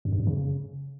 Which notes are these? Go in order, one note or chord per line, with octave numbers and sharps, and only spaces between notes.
F#2
G2
F#2
C#3